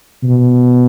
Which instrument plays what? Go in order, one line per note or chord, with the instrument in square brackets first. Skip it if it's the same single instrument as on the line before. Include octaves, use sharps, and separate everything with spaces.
[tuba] B2